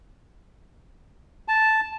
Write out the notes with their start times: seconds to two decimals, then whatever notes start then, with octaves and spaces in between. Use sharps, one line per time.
1.48 A5